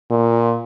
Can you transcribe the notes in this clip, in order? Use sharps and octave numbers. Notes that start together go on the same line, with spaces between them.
A#2